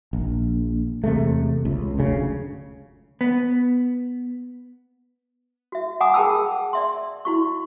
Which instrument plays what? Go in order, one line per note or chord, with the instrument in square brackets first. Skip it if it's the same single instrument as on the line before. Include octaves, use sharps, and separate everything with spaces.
[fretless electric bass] A#1
E2 C3 G#3 A3
C#2
F1 D2 C#3
[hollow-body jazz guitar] B3
[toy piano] F#4 E5
F#5 G#5 A#5 D6 D#6
G#4 A#4 G5 A5 B5 E6
D5 E5 C6
E4 F#4 C#6